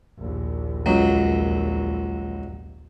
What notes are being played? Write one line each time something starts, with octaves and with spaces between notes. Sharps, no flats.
A#1 D#2
C#2 F#3